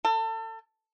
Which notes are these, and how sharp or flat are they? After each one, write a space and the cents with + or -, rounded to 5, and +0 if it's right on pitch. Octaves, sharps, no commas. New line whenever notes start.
A4 +30